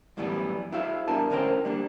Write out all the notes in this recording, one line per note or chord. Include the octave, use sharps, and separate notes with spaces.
F#2 A2 E3 G3 B3
E4 F#4 G#4 C5 E5 F5
G2 B3 D4 A#4 G#5 A5
D2 A2 C#4 A#4 C5 G5
G3 A#3 D4